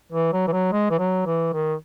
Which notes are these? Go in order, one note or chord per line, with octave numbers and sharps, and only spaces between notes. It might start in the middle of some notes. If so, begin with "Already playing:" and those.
E3
F#3
E3
F#3
G#3
E3
F#3
E3
D#3